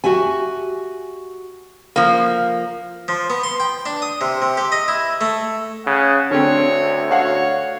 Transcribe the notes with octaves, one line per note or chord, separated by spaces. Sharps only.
F#4 G4 E5 G#5
F3 A#3
F3
B3
C6
G5
D4
D#6
C3
C3
G4
D#5
E4
A3
C#3 F#5
D2 D3 A3 C4 C#5
F#4 C#5 F5 F#5